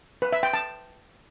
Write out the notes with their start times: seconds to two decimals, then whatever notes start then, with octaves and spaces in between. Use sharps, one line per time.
0.22 B4
0.33 E5
0.43 G5
0.53 A5